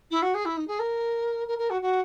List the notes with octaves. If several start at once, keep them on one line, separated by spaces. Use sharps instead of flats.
E4
F#4
G#4
E4
D#4
G#4
A#4
A#4
A#4
F#4
F#4